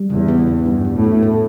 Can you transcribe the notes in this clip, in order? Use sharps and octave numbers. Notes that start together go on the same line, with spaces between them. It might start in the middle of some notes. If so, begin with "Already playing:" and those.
Already playing: G3
E2 C#3
B3
C#3
G2 D4
F#3
A2
A3
A4